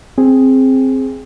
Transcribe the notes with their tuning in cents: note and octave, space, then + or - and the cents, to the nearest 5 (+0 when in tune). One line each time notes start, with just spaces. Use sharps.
C4 +5 G#4 +0